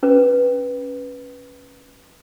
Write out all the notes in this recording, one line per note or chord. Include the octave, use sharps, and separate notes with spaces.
C#4 B4